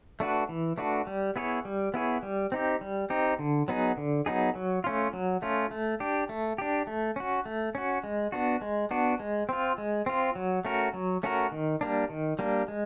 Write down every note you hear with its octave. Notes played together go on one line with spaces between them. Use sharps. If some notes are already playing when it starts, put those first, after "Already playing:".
A3 D4 F#4 B4
E3
A3 D4 F#4 B4
G3
B3 E4 G#4 C#5
G3
B3 E4 G#4 C#5
G3
C4 D#4 G4
G3
C4 D#4 G4
D3
F#3 B3 D#4 G#4
D3
F#3 B3 D#4 G#4
F#3
A3 C#4 F4
F#3
A3 C#4 F4
A3
D4 G4
A3
D4 G4
A3
C#4 F#4
A3
C#4 F#4
G#3
B3 D4 F#4
G#3
B3 D4 F#4
G#3
C4 F4
G#3
C4 F4
F#3
A3 C#4 F#4 A#4
F#3
A3 C#4 F#4 A#4
D#3
G3 A#3 D4
D#3
G3 A#3 D4
G#3